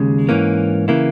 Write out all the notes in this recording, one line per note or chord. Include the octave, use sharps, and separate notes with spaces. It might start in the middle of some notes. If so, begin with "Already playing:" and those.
Already playing: D#2 C#3 G#3
G#2 E3 A#3 C#4
C#3 E3 A#3 E4